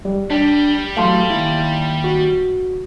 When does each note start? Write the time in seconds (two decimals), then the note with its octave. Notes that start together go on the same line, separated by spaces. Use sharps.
0.05 G3
0.30 G3 D4
0.97 E3 F#3 A3 F5 A5 C6
1.30 D#2 E4
2.04 F#4